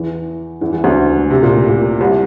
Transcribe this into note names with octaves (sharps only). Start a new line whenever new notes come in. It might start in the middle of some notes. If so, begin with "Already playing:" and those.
Already playing: E2 E3
E2 E3
E2 E3
D2 D3
C3
A#2
A2
A#2
C2 C3